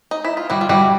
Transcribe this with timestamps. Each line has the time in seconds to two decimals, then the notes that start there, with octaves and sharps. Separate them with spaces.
0.11 D#4
0.25 E4
0.37 F4
0.50 G3 E4 F#4
0.61 F4
0.69 G3 E4 F#4